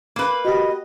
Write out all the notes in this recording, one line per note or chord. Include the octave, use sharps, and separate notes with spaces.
A#3 B4
F#4 G4 D#5